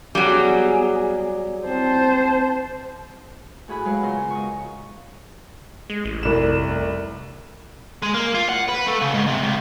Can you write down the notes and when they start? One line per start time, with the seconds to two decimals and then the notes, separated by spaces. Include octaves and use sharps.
0.15 F#3 G3 B3 G#4
1.66 C4 C5 A5
3.68 A2 F#4 G#4 B5 F#6
3.85 F#3 G#3 B4 F5 F#5
4.02 C#3 B3 F4 A#4 F5 C6
4.31 D#5 C#6
5.90 G#3
6.05 A1
6.23 F1 C2 E7
8.02 G#3
8.14 A#3
8.34 F4
8.49 F#5
8.68 B4
8.86 A3
9.01 C#3
9.14 G#2
9.28 C3
9.43 C#2